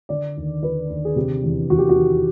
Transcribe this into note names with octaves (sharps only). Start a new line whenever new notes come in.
D3 D5
D#2
D3 B4
D#2
G#4
C3 G4
E2
E2 F#4
G4
F#4
D#3